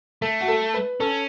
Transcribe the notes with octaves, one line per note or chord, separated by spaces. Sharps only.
A3 A4
F#4
A4
B4
C#4 A4